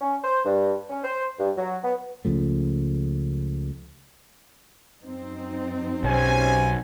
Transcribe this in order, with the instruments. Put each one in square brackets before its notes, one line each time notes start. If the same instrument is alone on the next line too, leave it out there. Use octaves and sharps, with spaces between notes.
[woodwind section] C#4
C5
G2
C#4
C5
G2
F#3
B3
[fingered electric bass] C#2 C#3 F3 A3
[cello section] F#2 C4 D#4
[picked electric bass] B1 [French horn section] C#4 G4 C5 [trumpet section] G#5